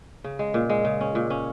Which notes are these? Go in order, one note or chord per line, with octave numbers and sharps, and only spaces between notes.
C#3
G#3
A#2
G#3
C#3
C#4
A#2
C#4